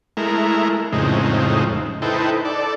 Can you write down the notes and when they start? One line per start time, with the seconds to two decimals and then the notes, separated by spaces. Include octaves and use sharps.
0.17 G#3 A3 E4 A#4
0.92 F2 A2 C#3 G#3 C4 D#4
2.02 D#4 E4 A4 B4 C5 G5
2.45 A4 D5